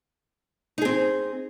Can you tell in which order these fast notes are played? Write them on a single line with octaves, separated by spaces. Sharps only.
D#4 G#4 C4